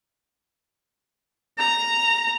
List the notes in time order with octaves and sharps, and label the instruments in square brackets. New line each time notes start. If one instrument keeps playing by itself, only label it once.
[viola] A#5